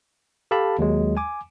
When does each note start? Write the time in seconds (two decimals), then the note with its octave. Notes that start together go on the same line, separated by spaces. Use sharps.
0.51 G4 A4 F5 A5 B5
0.79 D#2 F#3 G#3
1.17 G#5 D6